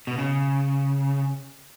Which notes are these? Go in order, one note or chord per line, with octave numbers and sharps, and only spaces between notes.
B2
C#3